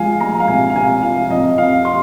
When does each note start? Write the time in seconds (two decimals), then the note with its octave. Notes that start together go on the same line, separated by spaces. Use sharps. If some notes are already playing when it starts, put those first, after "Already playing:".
Already playing: F3 G#3 F5 G#5
0.20 G#3 A#5
0.40 F5
0.47 C2 G#5
0.70 F5
0.76 C2 G#5
1.03 F3 F5
1.30 F2 D#5
1.57 F2 F5
1.85 C6